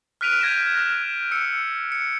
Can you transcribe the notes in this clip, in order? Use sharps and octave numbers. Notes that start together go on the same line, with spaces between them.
F6 F#6 B6 D7 D#7 F7
G6 G#6 A#6 D#7 E7
F6 E7
E6 C#7
C#7